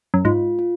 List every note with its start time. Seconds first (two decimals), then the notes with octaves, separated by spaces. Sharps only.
0.14 F#2
0.25 G#2 F4
0.59 F4